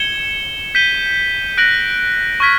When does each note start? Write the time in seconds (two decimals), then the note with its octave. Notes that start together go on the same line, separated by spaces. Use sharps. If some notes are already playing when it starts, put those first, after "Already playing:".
Already playing: G#6 C#7 E7 G7
0.75 G6 B6 D#7 G7
1.58 F#6 A#6 D7 F#7
2.40 C#6 F6 G#6 B6